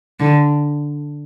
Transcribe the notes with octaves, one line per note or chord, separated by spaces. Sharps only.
D3